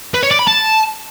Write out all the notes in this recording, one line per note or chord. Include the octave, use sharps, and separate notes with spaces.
B4
C#5
D5
B5
A5